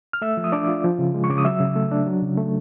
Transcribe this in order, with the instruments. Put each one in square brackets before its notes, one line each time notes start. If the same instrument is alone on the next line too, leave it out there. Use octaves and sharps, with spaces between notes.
[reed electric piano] F6
A3 E5 E6
F3
D#6
D4 D5 D6
F4
F3
C#3
G#3
C#6
C#3 D6
D#6
F#3 E5 E6
C#3
A3
D4
F#3
C#3
A3